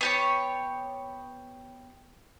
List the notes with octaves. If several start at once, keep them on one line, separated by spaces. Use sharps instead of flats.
B3 G4 C#5